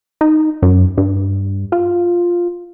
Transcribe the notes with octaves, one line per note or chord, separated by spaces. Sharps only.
D#4
F#2
G2
F4